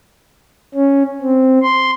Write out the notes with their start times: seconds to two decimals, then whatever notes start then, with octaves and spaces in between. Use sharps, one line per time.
0.74 C#4
1.22 C4
1.62 C6